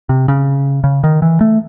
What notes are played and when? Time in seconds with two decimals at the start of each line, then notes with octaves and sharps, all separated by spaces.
0.09 C3
0.28 C#3
0.84 C#3
1.04 D#3
1.22 E3
1.41 A3